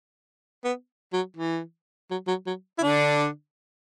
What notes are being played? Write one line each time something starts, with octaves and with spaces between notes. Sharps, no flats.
B3
F#3
E3
F#3
F#3
F#3
E4
D3 D4